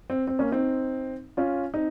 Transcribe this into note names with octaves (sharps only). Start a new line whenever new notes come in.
C4
C4
A#3 C#4
C4 D#4
C#4 F4
C4 D#4